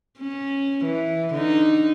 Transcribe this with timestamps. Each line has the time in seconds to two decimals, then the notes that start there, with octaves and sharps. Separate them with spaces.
0.20 C#4
0.85 E3
1.35 D3 D#4